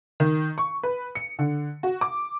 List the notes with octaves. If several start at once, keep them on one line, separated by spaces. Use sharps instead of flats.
D#3
C#6
B4
C#7
D3
F#4
D6